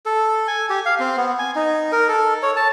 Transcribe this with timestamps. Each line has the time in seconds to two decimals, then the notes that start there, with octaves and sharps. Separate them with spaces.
0.06 A4
0.48 G#5
0.70 G4
0.86 F5
1.00 C4
1.17 B3
1.39 G#5
1.56 D#4
1.92 A#4
2.09 A4
2.42 C#5
2.56 A5